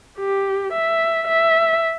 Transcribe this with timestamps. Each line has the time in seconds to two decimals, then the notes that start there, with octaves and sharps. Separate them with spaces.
0.19 G4
0.73 E5
1.28 E5